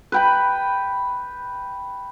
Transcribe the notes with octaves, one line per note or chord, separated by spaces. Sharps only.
B4 G5 B5